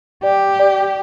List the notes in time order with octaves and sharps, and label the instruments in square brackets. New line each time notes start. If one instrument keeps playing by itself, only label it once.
[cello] G4 [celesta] D5
[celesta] D5